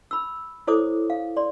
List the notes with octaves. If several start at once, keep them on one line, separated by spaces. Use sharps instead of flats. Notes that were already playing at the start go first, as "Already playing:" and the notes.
B5 E6
E4 A4 C5 C#5 D6 D#6
F5
D5 C6